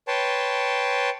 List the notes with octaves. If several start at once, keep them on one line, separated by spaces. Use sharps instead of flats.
B4 C#5 G5 A5 C6